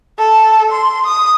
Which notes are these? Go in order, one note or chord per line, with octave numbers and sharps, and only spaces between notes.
A4
C6
D#6